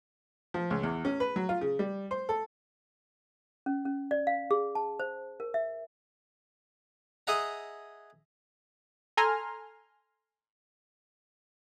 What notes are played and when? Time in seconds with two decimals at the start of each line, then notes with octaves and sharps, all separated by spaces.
0.54 F3
0.70 C#2
0.83 E2
1.05 C#4
1.20 B4
1.36 F#3
1.49 F4
1.61 C#3
1.79 G3
2.11 C5
2.29 A4
3.66 C#4
3.85 C#4
4.11 D5
4.27 F5
4.51 G#4
4.75 A5
5.00 C5
5.40 A#4
5.54 E5
7.27 G#4 D#5 E5 F#5 A#5
9.17 A4 G#5 A#5 C6 F6